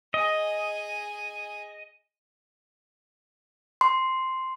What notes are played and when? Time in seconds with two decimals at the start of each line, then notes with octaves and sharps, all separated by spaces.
0.14 G#4 D#5 G#5
3.81 C6